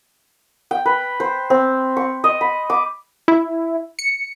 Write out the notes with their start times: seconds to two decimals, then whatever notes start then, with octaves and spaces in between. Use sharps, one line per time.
0.71 G5
0.86 B4
1.20 C5
1.50 C4
1.97 C#6
2.24 D#5
2.41 B5
2.70 D6
3.28 E4
3.99 C#7